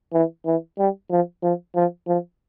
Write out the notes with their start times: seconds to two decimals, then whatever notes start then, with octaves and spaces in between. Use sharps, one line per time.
0.13 E3
0.46 E3
0.78 G3
1.11 F3
1.43 F3
1.76 F3
2.07 F3